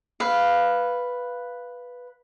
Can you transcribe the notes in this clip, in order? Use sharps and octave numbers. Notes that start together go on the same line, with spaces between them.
B4 F5